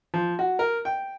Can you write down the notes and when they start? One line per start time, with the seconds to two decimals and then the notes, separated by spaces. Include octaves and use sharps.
0.14 F3
0.39 F#4
0.59 A#4
0.85 G5